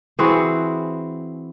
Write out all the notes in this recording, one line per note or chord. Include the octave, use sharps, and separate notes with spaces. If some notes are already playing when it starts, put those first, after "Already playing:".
E3 C4 F#4 G#4